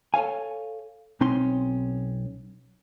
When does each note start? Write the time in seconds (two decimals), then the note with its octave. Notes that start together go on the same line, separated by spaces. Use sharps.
0.14 A4 C#5 F5 G#5
1.21 B1 C4 C#4 D#4 C6